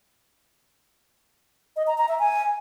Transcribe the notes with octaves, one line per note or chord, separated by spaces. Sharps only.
D#5
A#5
A#5
E5
G#5